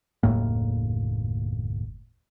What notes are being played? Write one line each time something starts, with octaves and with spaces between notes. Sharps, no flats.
F#1 D#2 A2 A#3